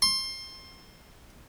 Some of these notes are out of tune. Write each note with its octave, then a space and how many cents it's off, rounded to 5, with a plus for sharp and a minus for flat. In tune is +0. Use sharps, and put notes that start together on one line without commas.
C6 +20